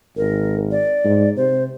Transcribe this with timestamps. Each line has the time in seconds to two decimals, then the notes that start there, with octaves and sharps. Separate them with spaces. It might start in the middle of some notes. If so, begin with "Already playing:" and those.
0.17 G#1 A#4
0.71 D5
1.05 G#2
1.37 C3 C5